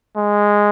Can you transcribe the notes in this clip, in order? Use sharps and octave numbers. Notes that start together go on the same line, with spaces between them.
G#3